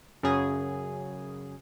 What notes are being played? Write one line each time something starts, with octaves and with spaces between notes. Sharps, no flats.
F#2 C#3 G#4